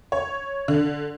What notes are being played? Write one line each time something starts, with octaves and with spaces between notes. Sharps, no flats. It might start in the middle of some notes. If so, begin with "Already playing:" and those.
C#5
D3